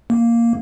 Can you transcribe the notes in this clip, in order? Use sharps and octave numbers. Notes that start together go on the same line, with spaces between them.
A#3